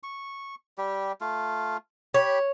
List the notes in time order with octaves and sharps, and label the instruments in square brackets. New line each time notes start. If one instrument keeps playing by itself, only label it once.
[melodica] C#6
G3 G4
A3 F4
[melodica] G4 B5 [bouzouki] C#5